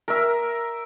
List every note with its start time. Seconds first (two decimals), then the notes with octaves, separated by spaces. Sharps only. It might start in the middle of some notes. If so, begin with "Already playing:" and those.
0.08 A#4 E5